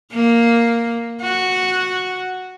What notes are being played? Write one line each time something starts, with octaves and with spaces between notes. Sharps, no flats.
A#3
F#4